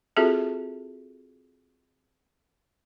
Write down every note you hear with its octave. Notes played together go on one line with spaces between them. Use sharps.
C4 F4 F#4 G#4 A4 E5